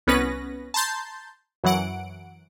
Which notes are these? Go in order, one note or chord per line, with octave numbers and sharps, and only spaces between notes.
C2 B3 C#4 B4 A#6
A5 A#5 C6 G6 A6
F#2 E3 F#3 F#5 D7